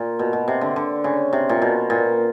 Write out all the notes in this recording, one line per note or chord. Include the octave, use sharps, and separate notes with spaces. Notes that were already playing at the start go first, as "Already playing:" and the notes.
Already playing: A#2
B2
B2
C3
D3
D3
C#3
C3
A#2
B2
A#2